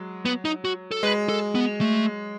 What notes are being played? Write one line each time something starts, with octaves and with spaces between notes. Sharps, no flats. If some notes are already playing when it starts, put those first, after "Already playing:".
Already playing: F#3 G#3
B3
D#4
F#4
A4
G#3 B4
A4
B3
A3